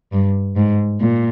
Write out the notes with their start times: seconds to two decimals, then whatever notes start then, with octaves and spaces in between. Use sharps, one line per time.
0.13 G2
0.56 G#2
1.01 A#2